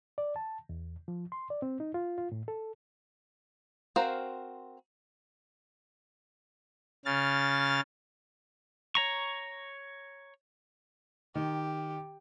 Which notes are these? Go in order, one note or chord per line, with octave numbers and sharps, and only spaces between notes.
D5
A5
E2
F3
C6
D5
C4
D#4
F4
F4
A2
A4
C4 F#4 A#4 C5 F5
C#3 F6 A6
C#5 A#5 C#6
D#3 G4